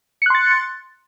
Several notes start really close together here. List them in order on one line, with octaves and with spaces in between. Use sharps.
C#7 F#6 C6 A6